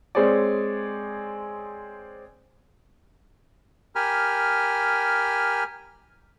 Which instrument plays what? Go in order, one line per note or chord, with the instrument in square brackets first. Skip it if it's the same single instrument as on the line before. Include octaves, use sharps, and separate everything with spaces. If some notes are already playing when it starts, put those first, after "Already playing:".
[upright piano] G#3 C4 G#4 C#5 D5
[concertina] G4 A#4 G#5 B5 F6